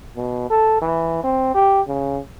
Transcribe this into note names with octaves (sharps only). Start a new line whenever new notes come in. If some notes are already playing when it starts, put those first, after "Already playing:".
B2
A4
E3
C4
G4
C#3